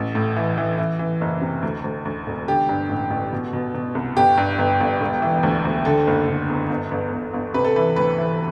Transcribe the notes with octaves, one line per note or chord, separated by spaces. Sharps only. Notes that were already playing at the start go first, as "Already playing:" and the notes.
Already playing: A1
A2
E3
E3
E3
E3
F#1
C3
D2
D2
D2
E1
D3 G4
G2
A1
A1
B2
B2
B2
C2
G1 G4
G2
G1
G1
E1
E3
D2
D2
D3 A4
F#1
D3
E2
G1
G1
G1
G1
C3 B4
A4
E3 B4
D2 B4
E3